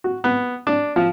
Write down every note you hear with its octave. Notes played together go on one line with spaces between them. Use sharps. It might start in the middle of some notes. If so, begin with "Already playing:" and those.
F#4
B3
D4
F3